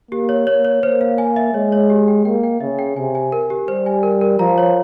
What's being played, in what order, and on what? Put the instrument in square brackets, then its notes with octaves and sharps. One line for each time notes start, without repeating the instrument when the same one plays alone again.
[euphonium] A#3 [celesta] G4
[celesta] C#5
[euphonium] A#3 [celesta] C#5
[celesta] C#5
[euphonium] A#3 [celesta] C5
[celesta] F5
G#5
E5
[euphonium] G#3 [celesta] C#5
[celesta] C#5
G4
G5
[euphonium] A#3 [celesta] G5
[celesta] G5
[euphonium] C#3 [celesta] E5
[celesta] G5
[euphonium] C3 [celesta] G#5
[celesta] G#5
A#4
G4
[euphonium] G3 [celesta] C5
[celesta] G#5
A#4
A#4
[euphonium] F3 [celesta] A#5
[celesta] C#5